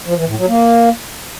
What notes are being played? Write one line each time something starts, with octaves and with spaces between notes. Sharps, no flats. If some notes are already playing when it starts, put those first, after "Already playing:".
F3
E3
A2
F#3
A#3